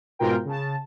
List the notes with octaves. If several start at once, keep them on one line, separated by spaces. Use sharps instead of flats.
G#2 B2 F4 A#4 G5
C#3 A5